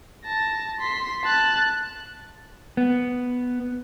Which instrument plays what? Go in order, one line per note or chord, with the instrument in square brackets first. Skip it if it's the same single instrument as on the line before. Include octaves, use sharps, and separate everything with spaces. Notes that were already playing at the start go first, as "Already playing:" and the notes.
[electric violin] A5 A#6
C6 B6
A5 F#6
[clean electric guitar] B3